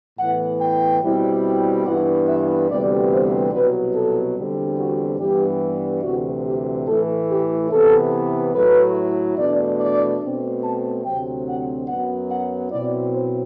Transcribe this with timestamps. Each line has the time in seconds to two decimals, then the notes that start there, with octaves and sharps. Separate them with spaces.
0.18 A2 E3 B3 E4 F#5
0.60 G5
1.02 B2 G3 C4 E4
1.86 G2 E3 B3 E4 F#5
2.27 E5
2.69 D2 C3 E3 G3 B3 D5
3.11 C5
3.53 C2 B2 F#3 B4
3.94 A4
4.37 E2 D3 G3 C4
4.78 F#4
5.20 G2 E3 G3 B3 G4
6.03 D2 C3 E3 F#4
6.45 G4
6.87 A2 E3 A3 E4 A4
7.29 G4
7.71 C3 E3 B3 E4 A4
8.54 A2 F#3 A3 E4 B4
9.38 E2 B2 A3 D4 D5
9.79 D5
10.22 B2 A3 C4
10.63 A5
11.05 D2 C3 F#3 C4 G5
11.46 F#5
11.88 F#2 F#3 B3 F#5
12.30 F#5
12.72 B2 F#3 C4 E4 D5
13.14 C5